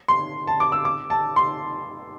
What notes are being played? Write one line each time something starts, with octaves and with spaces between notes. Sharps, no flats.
C6
A5
D6
E6
D6
A5
C6